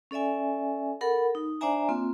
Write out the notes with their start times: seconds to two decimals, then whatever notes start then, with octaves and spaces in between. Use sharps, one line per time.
0.11 C#4 A4 D5 E5 G#5
1.01 A4 A#4 F#5 B5
1.35 D#4
1.61 D4 C5 D5 E5 G#5 A#5
1.89 A#3 C4 F4